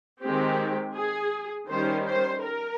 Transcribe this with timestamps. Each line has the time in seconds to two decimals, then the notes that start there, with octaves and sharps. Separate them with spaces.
0.21 D#3 G#3 C4 G4
0.95 G#4
1.69 D#3 G3 C#4 C5
2.06 C5
2.42 A#4